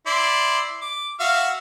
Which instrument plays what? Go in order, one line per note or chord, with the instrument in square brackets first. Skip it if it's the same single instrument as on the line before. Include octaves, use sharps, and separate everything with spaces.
[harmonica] E4 D5 C6
D6
F#4 E5 F5